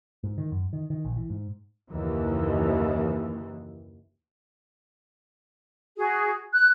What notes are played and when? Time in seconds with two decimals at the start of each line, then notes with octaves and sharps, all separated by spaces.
0.24 G#2
0.38 D#3
0.52 F#2
0.73 D#3
0.90 D#3
1.05 A#1
1.17 E3
1.30 G#2
1.88 F#1 D#2 E3
5.97 F#4 G#4
6.52 F#6